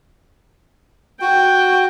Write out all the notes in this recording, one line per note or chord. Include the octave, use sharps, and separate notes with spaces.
F#4 G5